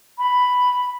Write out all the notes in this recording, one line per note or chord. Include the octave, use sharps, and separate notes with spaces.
B5